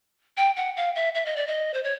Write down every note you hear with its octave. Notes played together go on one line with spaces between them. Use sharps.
G5
F#5
F5
E5
E5
D#5
D5
D#5
C5
C#5